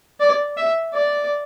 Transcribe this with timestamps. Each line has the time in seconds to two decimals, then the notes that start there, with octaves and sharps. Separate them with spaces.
0.20 D5
0.57 E5
0.94 D5